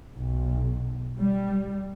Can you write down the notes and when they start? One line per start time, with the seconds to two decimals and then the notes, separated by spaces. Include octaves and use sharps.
0.15 B1
1.18 G3